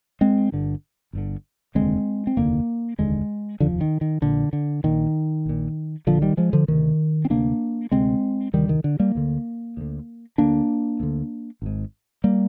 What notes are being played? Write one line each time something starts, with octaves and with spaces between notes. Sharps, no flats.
G#3 C4
G1 G2 D3
G1 G2 D3
F1 D#2 D3 G#3 C4
C4
F1 D#2 D3 A#3
F1 D#2 D3 G#3
F1 D#2 D3 F3
D#3
D#3
A#1 A#2 D3
D3
A#1 A#2 D#3
A#1 A#2
A#1 A#2 D3 F3
D#3 G3
F3 G#3
D3 F3
D2 C3 D#3
C4
D2 C3 A#3 D4
D2 C3 G#3 C4
D2 C3 D#3 G3
D#3
D3
G3 A#3
D2 D3
D2 D3
D2 D3 A#3 D4
D2 D3
G#1 G#2
G3 A#3